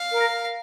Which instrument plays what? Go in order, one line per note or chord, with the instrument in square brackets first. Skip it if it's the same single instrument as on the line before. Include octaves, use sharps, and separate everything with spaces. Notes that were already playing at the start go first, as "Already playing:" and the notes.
Already playing: [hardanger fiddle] F5
[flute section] A#4